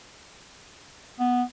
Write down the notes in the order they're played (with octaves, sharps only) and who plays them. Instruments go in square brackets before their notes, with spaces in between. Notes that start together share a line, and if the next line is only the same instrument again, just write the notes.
[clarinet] B3